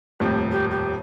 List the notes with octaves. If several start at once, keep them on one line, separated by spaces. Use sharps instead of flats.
D#1 F2 A2 G4
G4
G4